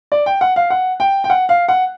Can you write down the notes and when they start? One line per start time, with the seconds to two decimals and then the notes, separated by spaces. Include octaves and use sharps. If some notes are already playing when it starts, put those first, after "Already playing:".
0.12 D5
0.26 G5
0.41 F#5
0.56 F5
0.70 F#5
1.00 G5
1.24 G5
1.30 F#5
1.49 F5
1.68 F#5